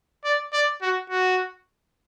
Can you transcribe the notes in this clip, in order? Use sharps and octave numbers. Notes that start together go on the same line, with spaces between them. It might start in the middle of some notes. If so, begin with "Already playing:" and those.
D5
D5
F#4
F#4